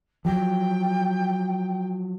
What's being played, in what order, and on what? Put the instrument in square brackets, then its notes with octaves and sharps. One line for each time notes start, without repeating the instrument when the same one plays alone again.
[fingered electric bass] F3 F#3 [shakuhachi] G5